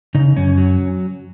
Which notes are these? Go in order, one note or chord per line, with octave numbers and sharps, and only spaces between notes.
C#3 D#4
F#2 C#4
F#3